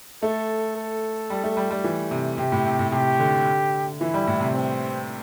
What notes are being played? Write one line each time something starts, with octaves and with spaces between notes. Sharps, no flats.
A3 A4
A4
G3
A3
G3
G3
E3
C3
C3 G4
A2
C3
A2
C3 G4
D3
E3 E4
G3
A2
C3
C4